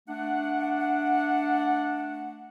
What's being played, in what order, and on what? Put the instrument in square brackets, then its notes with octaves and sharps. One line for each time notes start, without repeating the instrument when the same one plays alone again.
[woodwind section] A3 D4 F#5